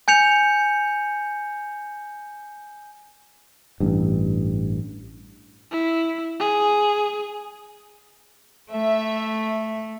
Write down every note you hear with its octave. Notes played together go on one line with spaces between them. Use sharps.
G#5 G6 C#7 F7
A1 G2
E4
G#4
A3 E5